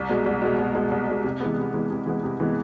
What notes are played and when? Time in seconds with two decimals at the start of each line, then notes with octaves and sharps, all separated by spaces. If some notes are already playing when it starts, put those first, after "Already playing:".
Already playing: C2
0.09 B2 G#3
0.26 C2
0.42 B2 G#3
0.58 C2
0.75 B2 G#3
0.91 C2
1.07 B2 G#3
1.24 C3
1.40 E3 G#3 B3
1.58 C3
1.74 E3 G#3 B3
1.90 C3
2.06 E3 G#3 B3
2.23 C3
2.40 E3 G#3 B3